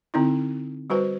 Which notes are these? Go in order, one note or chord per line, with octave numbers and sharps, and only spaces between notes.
D3 C4 D#4 E4
G3 F#4 B4 C5